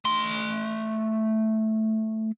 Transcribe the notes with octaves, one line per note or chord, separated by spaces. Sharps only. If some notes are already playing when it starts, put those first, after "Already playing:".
A3 C6